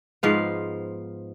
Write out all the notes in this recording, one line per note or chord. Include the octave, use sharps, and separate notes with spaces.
G#2 F3 B3 F5